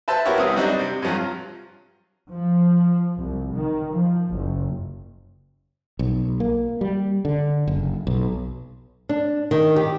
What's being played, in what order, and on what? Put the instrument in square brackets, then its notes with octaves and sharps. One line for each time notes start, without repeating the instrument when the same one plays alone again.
[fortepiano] B4 C5 E5 A5
B3 E4 F#4 G4 A#4 C#5
C2 C3 B3 C4 D#6
F#3 G3 C4 D4 D#4 G4
C3
G2 C3 F3 F#3
[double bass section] F3
C2
D#3
F3
F#1
[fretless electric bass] B1
A#3
G3
D3
F#1
B1
[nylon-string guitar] D4
D#3
G4